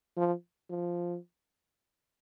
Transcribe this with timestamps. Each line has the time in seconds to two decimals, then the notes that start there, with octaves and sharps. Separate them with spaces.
0.17 F3
0.70 F3